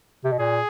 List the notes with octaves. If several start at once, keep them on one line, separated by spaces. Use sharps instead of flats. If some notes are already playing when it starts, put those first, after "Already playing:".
C3
B2
A#2 G#4